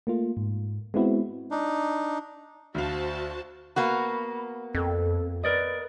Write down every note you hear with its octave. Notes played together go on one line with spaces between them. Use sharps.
A3 A#3 F4
G#2
G#3 B3 C4 E4 F#4
D4 D#4
D2 F#4 C5 F5 A5
A#3 B3 F#4 B5
F2 A4
A#4 B4 D5 D#5